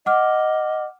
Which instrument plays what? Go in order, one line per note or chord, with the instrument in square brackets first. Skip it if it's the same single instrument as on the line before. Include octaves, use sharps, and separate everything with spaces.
[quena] D#5 [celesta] F#5 D6 F6